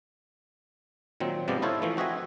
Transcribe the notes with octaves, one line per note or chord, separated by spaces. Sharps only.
A#2 D#3 F#3 C4
G#2 C3 F3 B3 D5
D#4 E4 A4 C5 C#5 F5
E3 F3 A3
C4 F#4 D#5 E5 G#5